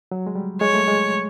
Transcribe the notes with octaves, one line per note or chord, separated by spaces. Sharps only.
F#3
G#3
G3
G#3 C#5
A3
G#3